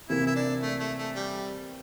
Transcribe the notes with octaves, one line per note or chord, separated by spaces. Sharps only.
C3 E3 A#3 E4
E4
D4
A3
A3
A3
G3